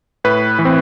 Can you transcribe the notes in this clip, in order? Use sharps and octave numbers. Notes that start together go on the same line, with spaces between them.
A2 B4
E3
C4